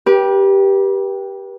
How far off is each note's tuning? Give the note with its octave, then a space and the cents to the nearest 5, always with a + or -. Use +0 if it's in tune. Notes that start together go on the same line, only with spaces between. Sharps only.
G4 +0 B4 -40